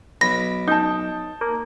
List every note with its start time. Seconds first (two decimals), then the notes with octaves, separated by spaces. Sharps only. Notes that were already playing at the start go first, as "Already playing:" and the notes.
0.21 B1 B5 A#6
0.68 D#4 A5 G6
1.41 A#3